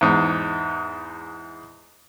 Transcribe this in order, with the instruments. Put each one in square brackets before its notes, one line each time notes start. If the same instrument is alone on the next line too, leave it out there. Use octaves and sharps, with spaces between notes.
[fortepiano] E2 G#2